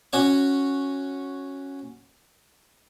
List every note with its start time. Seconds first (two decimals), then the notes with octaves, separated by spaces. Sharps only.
0.13 C#4 F#4 C#5 C#6